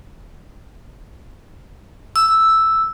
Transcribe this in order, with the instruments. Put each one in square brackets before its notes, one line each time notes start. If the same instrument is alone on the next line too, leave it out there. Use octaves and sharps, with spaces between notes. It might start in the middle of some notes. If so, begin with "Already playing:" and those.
[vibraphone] E6